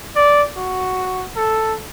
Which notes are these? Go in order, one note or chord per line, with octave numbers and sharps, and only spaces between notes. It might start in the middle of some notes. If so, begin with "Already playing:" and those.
D5
F#4
A4